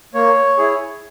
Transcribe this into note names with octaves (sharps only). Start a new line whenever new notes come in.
A#3 C#5
E4 G#4